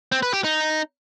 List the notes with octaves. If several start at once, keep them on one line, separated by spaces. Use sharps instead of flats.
C4
B4
G4
D#4